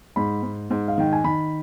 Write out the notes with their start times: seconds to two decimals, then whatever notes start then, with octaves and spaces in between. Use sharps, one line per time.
0.16 G#2 B5
0.43 G#2
0.70 G#2
0.88 F5
0.98 D#3 G5
1.13 G#5
1.24 D#3 B5